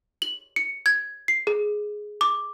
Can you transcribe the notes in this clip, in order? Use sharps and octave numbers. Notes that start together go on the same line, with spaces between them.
F#7
C#7
G#6
C7
G#4
D6